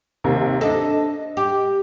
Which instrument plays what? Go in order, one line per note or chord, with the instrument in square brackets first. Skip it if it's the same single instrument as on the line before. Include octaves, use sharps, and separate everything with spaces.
[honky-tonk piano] D#2 C3 A#4
[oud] D4 A4 [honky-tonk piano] D#5
[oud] G4